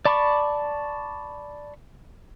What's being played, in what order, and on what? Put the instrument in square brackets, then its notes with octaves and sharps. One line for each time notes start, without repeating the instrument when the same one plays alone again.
[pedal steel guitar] D5 A5 B5 C#6 D6